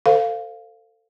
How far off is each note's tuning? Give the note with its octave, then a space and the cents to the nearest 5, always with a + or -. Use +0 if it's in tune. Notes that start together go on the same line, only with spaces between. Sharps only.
A4 +30 C5 -10 F5 +0